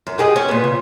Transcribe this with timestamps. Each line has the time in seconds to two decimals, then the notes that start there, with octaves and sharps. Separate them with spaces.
0.07 F#2
0.18 G4 G#4 D#5
0.36 C#4
0.48 A#2 B3
0.64 C#3